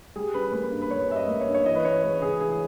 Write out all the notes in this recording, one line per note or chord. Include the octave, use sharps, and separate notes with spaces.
G3 G#4
C#4 B4
A#3 B4
G2
B4
G3 C#5
C#4 E5
D#5
A#3
C#5
G2
C#5
E3 D#5
B4
C#4 C#5
G#3 B4
C#3 G#4
E3 G#4